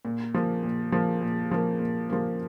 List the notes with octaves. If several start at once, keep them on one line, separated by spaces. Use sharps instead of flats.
A#2
F3 A#3
A#2
F3 A#3
A#2
F3 A#3
A#2
F3 A#3